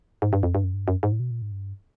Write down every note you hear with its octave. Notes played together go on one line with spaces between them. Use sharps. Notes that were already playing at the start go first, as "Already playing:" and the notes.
G#2
G2
F2
G2
F#2
G2
F#2
G#2
A2
B2
A#2
G#2
G2